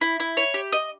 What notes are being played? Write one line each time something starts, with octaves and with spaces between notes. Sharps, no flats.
E4
E4
C#5
G4
D#5